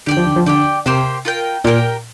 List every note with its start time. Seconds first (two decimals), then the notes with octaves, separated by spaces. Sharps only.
0.06 D3 G4 D5 G5
0.17 F3
0.27 D3
0.36 F3
0.46 D3 G4 D5 G5
0.86 C3 A#3 G4 C5 G5
1.25 F4 A#4 G5
1.64 A#2 G4 A#4 G5